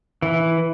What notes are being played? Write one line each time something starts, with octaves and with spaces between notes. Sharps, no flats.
E3